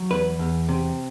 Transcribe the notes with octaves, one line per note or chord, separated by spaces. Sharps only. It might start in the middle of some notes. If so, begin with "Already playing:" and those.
Already playing: F#3
E2 B4
E2
C3